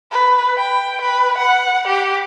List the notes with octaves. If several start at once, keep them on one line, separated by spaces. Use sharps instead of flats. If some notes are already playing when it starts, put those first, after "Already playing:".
B4
G5
B4
F#5
G4